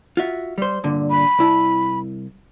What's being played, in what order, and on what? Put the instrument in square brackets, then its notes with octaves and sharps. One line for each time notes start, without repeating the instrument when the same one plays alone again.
[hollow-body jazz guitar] F4 F#4 E5
G3 C5
G2 A#2 D3
[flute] B5
[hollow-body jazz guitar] C2 E4 A5